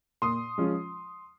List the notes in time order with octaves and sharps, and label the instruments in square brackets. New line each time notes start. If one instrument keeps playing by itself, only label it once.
[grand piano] A#2 C6 D#6
F3 G#3 C#4 F4